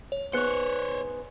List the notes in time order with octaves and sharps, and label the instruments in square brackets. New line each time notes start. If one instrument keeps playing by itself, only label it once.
[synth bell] C#5
[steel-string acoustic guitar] B3 D#4 G#4 [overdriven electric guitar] C5 C#5 [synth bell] F#6 C#7